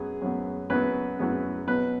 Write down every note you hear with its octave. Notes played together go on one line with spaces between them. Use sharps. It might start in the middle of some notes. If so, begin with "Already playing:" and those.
Already playing: F#2 F#3 B3 G#4
F#2 F#3 B3
F#2 F#3 B3 B4
F#2 F#3 B3
B2 F#3 B3 B4